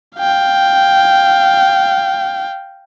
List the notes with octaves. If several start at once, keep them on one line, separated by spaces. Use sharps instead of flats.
F5 G5